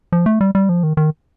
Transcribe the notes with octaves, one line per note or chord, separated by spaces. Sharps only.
F3
A3
G3
G3
F3
D#3
D#3